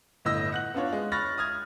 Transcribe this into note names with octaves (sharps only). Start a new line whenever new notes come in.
G1 A2 D#5 E6 A#6
F#5 F#6 F#7
B3 D4 F4 C#5
G#3
B5 C#6 F6 F#6 A6 A#6
D#6 F6 G#6